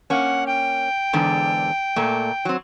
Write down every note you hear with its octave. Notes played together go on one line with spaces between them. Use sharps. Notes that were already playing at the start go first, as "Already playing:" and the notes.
A#3 C#4 F#5
G5
E2 G#2 D3
A#2 A3 A#3
F#3 C4